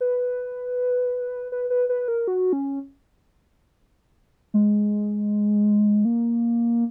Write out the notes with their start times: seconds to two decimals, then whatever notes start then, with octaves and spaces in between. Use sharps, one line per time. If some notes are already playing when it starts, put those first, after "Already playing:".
0.01 B4
1.52 B4
1.70 B4
1.89 B4
2.08 A#4
2.28 F#4
2.53 C#4
4.54 G#3
6.05 A#3